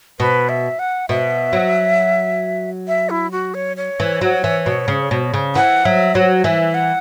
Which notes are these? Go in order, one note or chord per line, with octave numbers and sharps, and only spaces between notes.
B2 B4
E5
F#5
B2 E5
F#3
E5
E4
F#4
C#5
C#5
E3
F#3
E3
B2
C#3
B2
C#3
E3 F#5
F#3 E5
F#3 C#5
E3 E5
F#5